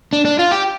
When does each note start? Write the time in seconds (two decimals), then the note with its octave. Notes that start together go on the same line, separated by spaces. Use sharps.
0.13 D4
0.25 D4
0.39 F4
0.51 G4